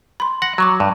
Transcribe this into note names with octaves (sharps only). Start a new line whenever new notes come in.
B5 C6
F#5 A#6
F#3 A#5 C#6 D6
G2